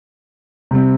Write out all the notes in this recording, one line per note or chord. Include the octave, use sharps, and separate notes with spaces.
C3 G3 C4